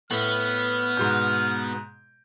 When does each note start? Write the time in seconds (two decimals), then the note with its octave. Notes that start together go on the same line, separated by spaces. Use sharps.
0.11 A2 B3 F6
0.97 G#2 B2 G6